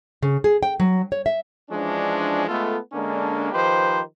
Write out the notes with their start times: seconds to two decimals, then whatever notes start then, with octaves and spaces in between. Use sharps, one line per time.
0.22 C#3
0.44 G#4
0.63 G5
0.80 F#3
1.12 C#5
1.26 E5
1.70 E3 F3 G#3 C#4 D4
2.48 G#3 A3 B3 F4 A4
2.93 D3 G#3 A#3 C#4 D4
3.52 D#3 F3 D#4 G4 B4 C5